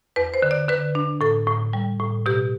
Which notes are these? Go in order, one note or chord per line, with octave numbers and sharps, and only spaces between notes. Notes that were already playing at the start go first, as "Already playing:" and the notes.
E2 B4
C5
D3
D5
D3 B4
D4
A2 A4
A2
G3
A2
B2 G4